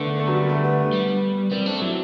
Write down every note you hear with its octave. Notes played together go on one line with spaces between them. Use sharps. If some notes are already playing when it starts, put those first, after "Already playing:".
Already playing: D3 A3 B3
B3
A3
F#3
G3
B3
A3
B3
B3
G3
G3 C4
A3 D4
F#3 E4